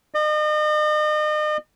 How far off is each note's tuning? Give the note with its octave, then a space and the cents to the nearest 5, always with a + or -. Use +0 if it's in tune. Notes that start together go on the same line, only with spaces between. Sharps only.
D#5 -40